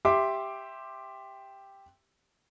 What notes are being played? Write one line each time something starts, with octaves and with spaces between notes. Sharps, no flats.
G4 E5 C6 D6